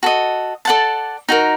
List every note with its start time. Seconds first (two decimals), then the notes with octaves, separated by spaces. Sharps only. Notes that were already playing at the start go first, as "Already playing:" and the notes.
0.03 F#4 A4 D#5
0.65 A4 D5 F#5 A5
1.29 D#4 F#4 A#4